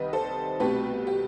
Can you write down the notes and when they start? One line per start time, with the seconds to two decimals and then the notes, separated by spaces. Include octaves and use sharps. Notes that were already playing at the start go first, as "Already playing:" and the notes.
Already playing: C2 C3 D#3 G3 B4 D#5
0.13 A4 C5
0.60 C2 B2 A3 G4 B4
1.07 G4